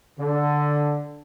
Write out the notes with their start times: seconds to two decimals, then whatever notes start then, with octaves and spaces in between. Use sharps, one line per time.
0.19 D3